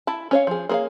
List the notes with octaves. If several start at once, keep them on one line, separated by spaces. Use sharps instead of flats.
E4 A5
C#4 C#5 F5
F3 G#4
A#3 G#4 C5 C#5 F5